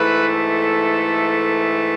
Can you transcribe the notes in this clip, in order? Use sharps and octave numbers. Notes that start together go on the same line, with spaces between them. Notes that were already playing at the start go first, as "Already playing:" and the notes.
Already playing: G#2 E3 A3 B4
A4